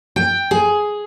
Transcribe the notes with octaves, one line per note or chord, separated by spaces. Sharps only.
G5
G#4